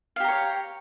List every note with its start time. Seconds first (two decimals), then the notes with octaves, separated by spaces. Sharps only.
0.16 F5
0.20 G4
0.24 A#5
0.28 C#5